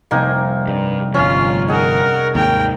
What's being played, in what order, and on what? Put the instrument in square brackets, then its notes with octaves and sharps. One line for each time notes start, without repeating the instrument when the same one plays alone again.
[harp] F1 C2 C3 [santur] A#3 D#4
[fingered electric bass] G2
[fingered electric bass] G1 F3 [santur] C#4 [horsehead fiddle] F4
[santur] D#4 G#4 [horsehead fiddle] A#4 F#5
[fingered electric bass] D#2 G#2 D#3 [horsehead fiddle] A#4 G5